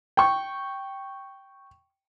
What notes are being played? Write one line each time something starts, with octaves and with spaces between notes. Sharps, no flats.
G5 C#6